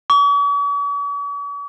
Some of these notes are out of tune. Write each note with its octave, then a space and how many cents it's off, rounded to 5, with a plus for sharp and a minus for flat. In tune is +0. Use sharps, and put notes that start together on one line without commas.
C#6 +45